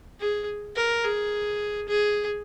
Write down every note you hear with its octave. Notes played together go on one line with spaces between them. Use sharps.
G#4
A#4
G#4
G#4